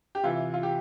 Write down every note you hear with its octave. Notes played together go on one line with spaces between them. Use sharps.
G4
C3 E3 F4
F4
G4